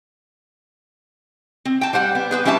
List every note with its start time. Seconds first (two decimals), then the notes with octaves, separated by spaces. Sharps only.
1.65 C4
1.81 G5 A5
1.93 G3 C5 F#5 G5
2.15 B3
2.31 G#4 B4 C5
2.45 G3 C#4 E4 E5 G5 A5